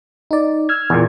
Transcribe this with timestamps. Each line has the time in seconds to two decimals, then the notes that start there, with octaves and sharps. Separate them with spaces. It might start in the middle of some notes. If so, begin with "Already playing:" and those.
0.31 D#4 D5
0.69 E6 F6 G#6
0.90 E2 A#2